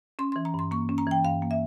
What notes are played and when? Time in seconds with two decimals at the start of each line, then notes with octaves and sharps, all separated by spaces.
0.19 C#4 C6
0.32 E3 C6
0.45 A#5
0.54 G2 C6
0.71 A#3 C#6
0.89 C#4
0.98 A#5
1.07 E3 G5
1.25 G2 F5
1.42 A#3
1.51 E5